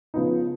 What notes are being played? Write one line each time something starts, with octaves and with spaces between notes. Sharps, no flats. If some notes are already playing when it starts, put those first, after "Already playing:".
C#3 F3 B3 D#4